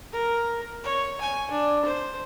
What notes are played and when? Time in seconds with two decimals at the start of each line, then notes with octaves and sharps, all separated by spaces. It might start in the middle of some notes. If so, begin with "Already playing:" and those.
0.12 A#4
0.84 C#5
1.22 G#5
1.51 D4
1.85 C5